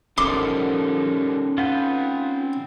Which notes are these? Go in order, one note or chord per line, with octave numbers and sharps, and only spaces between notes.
F3 G3 C#4 D#4 A4 A#4 C6 D6
C4 F4 B4 F#5 G5